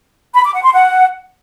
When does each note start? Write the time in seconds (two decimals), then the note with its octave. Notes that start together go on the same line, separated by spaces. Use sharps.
0.35 B5
0.44 D6
0.54 F#5
0.63 C6
0.73 F#5